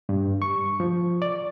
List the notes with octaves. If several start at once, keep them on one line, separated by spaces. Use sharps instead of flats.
G2
C#6
F3
D5